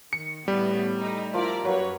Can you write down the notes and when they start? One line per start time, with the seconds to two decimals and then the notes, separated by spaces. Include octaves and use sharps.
0.13 D#3 C#7
0.48 A2 G3 B3
0.98 A3 D#4
1.34 F3 A#3 E4 D5 A#5
1.65 F#2 F#3 A#3 B4 C#5